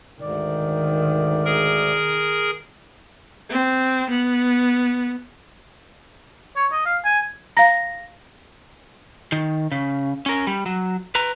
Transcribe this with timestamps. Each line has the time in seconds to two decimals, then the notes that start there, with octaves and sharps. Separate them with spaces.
0.21 D2 G#2 D#3 D5
1.45 G#4 A#4
3.50 C4
4.09 B3
6.56 C#5
6.72 D#5
6.86 F5
7.05 G#5
7.57 F5 A#5 A#6
9.32 D#3
9.72 C#3
10.26 C#4 A#4
10.47 G3
10.66 F#3
11.15 B4 A#5